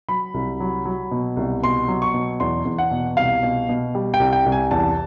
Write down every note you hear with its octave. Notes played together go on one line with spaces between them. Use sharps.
F#3 B5
C2
F#3
F#3
B2
C2
B2 C6
F#3
C#6
B2
E2 C6
E2
F#5
B2
C2 F5
B2
B2
G3
G5
C2
G5
C2
G#5
E2 A5